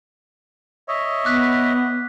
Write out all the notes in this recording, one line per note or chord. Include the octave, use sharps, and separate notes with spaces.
C#5 D#5 E5
B3 D6 F#6 B6